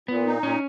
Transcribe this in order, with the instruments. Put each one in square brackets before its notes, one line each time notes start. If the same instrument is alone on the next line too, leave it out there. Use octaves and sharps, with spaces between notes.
[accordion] A#2 [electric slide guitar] B3
[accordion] D#4
[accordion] A#2 [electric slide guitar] C#4